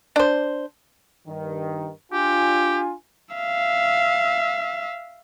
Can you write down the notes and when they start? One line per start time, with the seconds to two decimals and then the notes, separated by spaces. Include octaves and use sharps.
0.16 D4 C5
1.28 G2 D#3
2.12 D4 F4 G4 G#5
3.35 E5 F5